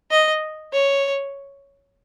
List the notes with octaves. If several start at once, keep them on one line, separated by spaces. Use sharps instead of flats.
D#5
C#5